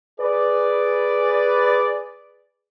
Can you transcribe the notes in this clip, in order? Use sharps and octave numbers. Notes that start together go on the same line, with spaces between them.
G#4 B4 D5